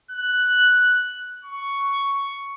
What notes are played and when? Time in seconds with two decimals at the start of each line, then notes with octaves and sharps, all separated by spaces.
0.11 F#6
1.45 C#6